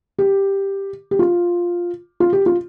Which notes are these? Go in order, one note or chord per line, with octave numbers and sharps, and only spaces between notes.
G4
G4
F4
F4
G4
F4